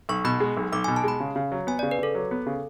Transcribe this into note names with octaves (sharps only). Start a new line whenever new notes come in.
B1 C#6
B2 B5
G#3
B1
B1 D6
G#5
B2
A5
G#3 B5
C#3
C#3
F#3
B3 G#5
D5
C#3
B4
C#3 A4
F#3
B3
C#3